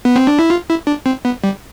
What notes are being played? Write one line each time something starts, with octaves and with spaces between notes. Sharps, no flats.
B3
C4
D4
E4
F4
E4
D4
C4
B3
G3